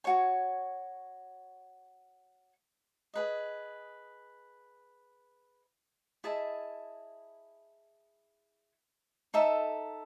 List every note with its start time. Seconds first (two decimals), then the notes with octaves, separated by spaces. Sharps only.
0.04 F#4 C#5 G#5
3.14 G#4 B4 D#5
6.24 E4 G#4 D#5 A5
9.34 D#4 A4 E5